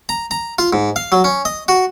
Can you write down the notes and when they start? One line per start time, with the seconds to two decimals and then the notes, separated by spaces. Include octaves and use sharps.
0.09 A#5
0.31 A#5
0.59 F4
0.73 G#2
0.96 F5
1.12 F#3
1.24 C#4
1.45 D#5
1.68 F#4